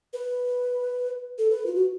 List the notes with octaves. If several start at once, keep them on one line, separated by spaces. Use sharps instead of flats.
B4
A4
B4
F4
F#4